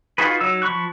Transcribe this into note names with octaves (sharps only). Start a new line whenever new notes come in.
D#4 F4 F#4 G#4 B4
F#3 D#4 E6
F3 B5 C#6 F#6